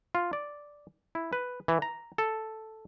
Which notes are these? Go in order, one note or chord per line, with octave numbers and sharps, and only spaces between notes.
F4
D5
E4
B4
E3
A#5
A4